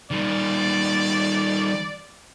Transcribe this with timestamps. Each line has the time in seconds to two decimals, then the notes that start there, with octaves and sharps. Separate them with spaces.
0.11 D#3 G3 D5